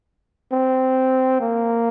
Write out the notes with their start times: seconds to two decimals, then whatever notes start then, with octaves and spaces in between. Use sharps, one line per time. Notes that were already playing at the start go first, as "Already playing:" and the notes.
0.53 C4
1.41 A#3